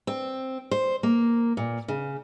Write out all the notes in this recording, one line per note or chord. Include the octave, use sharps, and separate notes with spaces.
C4
C5
A#3
A#2
C#3